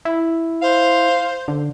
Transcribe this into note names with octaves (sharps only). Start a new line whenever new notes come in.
E4
C5 F5
D3